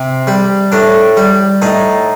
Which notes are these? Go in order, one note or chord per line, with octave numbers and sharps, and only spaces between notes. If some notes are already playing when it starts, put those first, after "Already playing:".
Already playing: C3
G3
A2 D4
G3
A2 D#4